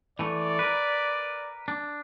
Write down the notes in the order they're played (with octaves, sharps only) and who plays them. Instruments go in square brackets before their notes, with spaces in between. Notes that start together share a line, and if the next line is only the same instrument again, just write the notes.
[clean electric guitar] E3 A3 [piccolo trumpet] D5
[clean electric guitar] A#4 B4
D4